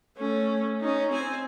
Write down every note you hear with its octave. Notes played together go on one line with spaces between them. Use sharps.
A3 C#4
C#4 D#4
C4 G#5